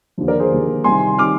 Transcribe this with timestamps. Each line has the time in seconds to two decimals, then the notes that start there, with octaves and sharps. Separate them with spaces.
0.18 D#2 D3 F3
0.28 A#4 D5
0.39 G#4 C5
0.51 D#2 D3 F3
0.84 C2 C3 D#3 G#5 C6
1.18 C3 D#3 D6 F6